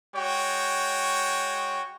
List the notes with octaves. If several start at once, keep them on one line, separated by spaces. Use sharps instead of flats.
G#3 F#4 C#5 G5